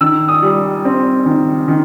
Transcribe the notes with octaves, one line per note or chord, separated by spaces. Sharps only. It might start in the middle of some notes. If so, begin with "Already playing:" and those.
D#3 E6
D#6
G3
C4
D#3
D#3